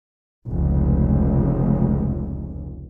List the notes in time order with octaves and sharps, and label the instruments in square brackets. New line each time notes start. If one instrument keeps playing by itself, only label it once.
[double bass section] F1 C#2